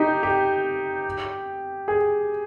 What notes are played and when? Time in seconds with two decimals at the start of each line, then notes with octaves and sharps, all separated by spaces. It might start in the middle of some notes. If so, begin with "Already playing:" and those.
Already playing: D#4 G4
0.23 G4
1.88 G#4